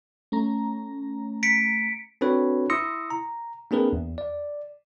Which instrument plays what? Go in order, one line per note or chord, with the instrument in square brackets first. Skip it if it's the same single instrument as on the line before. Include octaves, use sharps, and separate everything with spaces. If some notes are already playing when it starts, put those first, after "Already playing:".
[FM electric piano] A3 C#4 A#5
[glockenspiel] B6 C#7 D7
[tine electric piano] C4 D4 F#4 A4 B4 C#5
E4 C6 D#6 E6 A#6 C#7
A#5
A#3 C4 D4 G#4 A#4 B4
E2
D5